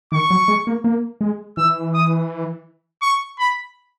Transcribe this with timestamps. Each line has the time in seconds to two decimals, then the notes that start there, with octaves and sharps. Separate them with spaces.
0.12 D#3 C#6
0.30 F#3
0.48 G#3
0.67 A#3
0.84 A#3
1.21 G#3
1.57 E3 E6
1.94 D#6
3.02 C#6
3.39 B5